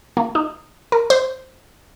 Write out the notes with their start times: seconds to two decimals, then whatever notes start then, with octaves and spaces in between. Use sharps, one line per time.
0.17 A#3
0.35 D#4
0.92 A#4
1.10 C5